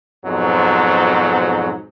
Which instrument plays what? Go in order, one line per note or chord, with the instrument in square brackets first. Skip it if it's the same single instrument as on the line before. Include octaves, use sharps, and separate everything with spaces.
[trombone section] F2 G#2 B2 F#3